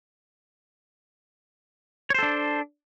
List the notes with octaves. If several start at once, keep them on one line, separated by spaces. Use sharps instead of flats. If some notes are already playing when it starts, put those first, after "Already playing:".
D4 A4 C5 C#5